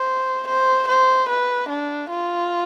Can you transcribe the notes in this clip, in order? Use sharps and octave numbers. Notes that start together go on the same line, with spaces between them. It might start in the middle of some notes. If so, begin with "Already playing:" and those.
Already playing: C5
C5
C5
B4
D4
F4